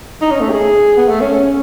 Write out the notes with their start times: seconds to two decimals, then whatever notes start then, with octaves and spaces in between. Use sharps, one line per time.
0.22 D#4
0.31 C#4
0.40 A3
0.50 G#4
0.97 B3
1.08 A3
1.21 C#4
1.34 C#4